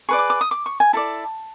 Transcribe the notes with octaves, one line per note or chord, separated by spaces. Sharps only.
G#4 B4 D5 C#6
D6
D6
D#6
D6
C#6
G#5
E4 A4 D5 A5